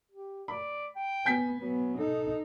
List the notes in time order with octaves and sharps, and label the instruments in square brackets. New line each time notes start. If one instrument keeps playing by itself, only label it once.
[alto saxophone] G4
[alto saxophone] D5 [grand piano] B5
[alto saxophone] G5
[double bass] B3 [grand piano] G#5 G6 B6
[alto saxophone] F#3 [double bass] B3
[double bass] D#4 [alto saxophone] A4